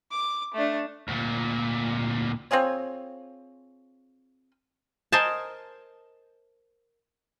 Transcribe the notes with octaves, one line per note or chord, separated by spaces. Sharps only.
D6
A3 D4
D2 A#2
C4 F4 G#4 C#5
A#4 C5 D#5 G#5 A5